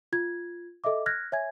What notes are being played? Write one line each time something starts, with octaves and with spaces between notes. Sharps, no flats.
F4 G#6
A4 D#5 E5 D6
F6 F#6 G#6 A#6
C#5 E5 G#5 G#6